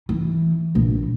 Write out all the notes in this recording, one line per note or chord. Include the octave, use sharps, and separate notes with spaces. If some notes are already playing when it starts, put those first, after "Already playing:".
E3
A#1